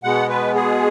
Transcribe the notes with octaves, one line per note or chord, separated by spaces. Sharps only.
B2 G#3 B3 F#5
B4
G#4